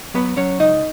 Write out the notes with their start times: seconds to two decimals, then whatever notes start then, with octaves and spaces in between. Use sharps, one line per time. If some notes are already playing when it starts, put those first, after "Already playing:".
0.14 F#3 B3 B4
0.37 F#3 C#4 C#5
0.59 C#2 D#4 D#5